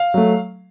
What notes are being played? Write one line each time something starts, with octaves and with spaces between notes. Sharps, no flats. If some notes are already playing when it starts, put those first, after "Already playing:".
Already playing: F5
F#3 A3